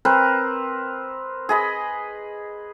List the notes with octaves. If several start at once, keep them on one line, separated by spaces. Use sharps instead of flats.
C4 A#4 B4
G#4 D#5 B5